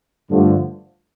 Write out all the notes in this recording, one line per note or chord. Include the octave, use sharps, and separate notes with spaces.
G2 D3 F3 A3